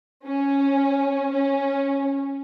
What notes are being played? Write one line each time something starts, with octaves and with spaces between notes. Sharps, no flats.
C#4
C#4